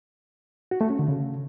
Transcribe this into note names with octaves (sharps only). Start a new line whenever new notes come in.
F#4
A3
C#4
D3
C#3